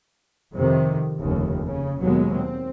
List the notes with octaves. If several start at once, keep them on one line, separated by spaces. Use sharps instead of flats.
F2 C3 D#3
F1 D#2 C#3
C#3
D#2 B2 F#3 G#3 A#3 B3
C4